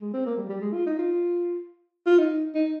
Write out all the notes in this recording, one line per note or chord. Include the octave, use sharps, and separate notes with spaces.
G#3
C4
A#3
G3
G3
G#3
F4
D#4
F4
F4
D#4
D#4